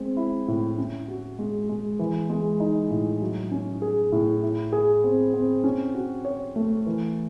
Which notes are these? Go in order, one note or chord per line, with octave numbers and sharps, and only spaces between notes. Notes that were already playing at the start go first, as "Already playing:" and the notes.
Already playing: G#3 C4
E4
A2
C#4
F#4
G#3
G#3
E3
G#3
D#4
A2
F#3
C#4
G#4
A2
E4
G#4
C4
C4
C#4
F#4
C#5
A3
E3